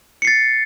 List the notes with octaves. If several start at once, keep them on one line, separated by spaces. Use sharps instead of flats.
A6 C7 C#7